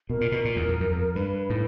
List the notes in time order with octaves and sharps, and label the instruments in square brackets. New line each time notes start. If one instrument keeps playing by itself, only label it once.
[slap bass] B2 [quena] A#4
[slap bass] A#2
B2
A#2
E2
F2
F#2
F2
[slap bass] G2 [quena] B4
[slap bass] A2